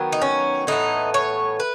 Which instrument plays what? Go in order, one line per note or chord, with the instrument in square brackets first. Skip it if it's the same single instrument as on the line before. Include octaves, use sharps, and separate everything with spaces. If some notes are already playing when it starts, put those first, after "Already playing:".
Already playing: [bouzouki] D#3 F#3 B3
D#4
C#4
A2 E3 B3 D#4
C#5
B4